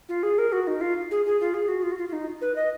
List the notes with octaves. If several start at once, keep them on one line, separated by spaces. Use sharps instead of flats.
F4
G#4
A#4
F#4
D#4
F4
G#4
G#4
F4
G#4
F#4
F4
F#4
F4
F4
D#4
B4
D#5